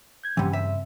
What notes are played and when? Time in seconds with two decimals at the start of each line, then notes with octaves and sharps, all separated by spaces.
0.23 G6 G#6
0.37 G2 C#3 E3 G3 C4
0.53 E5